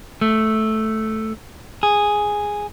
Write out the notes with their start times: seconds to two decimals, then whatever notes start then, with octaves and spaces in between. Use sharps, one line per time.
0.21 A3
1.83 G#4